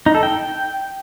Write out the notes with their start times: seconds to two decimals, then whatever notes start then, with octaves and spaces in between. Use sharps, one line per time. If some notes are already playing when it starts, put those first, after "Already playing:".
0.06 D#4
0.15 A4
0.23 G5